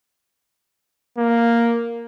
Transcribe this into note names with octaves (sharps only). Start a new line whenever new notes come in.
A#3